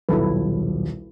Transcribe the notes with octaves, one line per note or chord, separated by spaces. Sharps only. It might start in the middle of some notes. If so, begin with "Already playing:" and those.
D#1 B1 E4 A4 B4